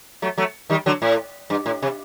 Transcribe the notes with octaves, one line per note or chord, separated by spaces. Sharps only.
F#3 A3
F#3 A3
D#3 G3
D3 F#3
A2
G2
A2
C3